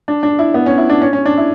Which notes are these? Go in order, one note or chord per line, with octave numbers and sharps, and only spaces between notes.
D4
D4
E4
B3
C#4
E4
D4
C#4
C#4
D4
E4